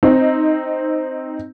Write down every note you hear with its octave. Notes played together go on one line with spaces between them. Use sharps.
C4 D#4